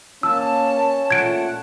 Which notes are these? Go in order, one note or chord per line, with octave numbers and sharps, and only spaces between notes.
A#3 C#4 A5 E6
A#2 A3 F#5 G#6 D7